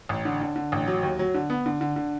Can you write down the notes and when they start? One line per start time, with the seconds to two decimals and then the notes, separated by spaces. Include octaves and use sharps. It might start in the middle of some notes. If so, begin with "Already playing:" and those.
0.09 A1
0.25 D3
0.41 D3
0.56 D3
0.72 A1
0.88 F#3
1.03 D#2
1.19 F#3
1.34 D3
1.50 B3
1.66 D3
1.81 D3
1.96 D3